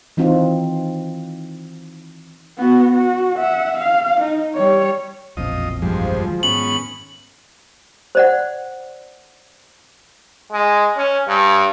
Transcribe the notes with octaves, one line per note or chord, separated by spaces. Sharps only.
D#3 E3 C4 D#4 F4
B3 F#4
F#4
E5 F#5
F5
D#4
G3 C#5
E1 A#1 F2 F3 D#5
G2 F3 G#3
D#3 F#3 G#3
G#2 B3 C#4 F#7
C5 D5 F#5
G#3
C#4
G2